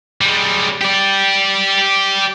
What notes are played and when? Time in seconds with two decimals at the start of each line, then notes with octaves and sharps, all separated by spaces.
0.21 G3 G#3
0.81 G4 D5